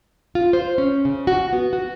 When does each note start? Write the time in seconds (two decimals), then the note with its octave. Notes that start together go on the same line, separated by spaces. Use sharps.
0.35 F4
0.53 C5
0.78 C#4
1.05 C#3
1.27 F#4
1.53 B3
1.73 F#4